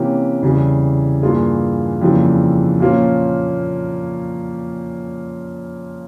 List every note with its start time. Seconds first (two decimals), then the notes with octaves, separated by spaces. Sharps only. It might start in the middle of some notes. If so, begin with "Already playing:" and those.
Already playing: C3 E3 A#3 C#4 G4
0.42 E2 C#3 E3 G3
1.23 G2 E3 A#3 F4 G#4
2.01 F2 C#3 E3 G3 A#3
2.80 A#2 F3 A#3 C#4